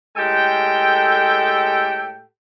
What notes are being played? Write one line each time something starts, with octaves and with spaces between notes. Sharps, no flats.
A2 G#3 G4 A4 G5